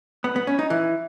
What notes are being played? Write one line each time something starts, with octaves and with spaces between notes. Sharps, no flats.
B3
B3
C#4
D#4
E3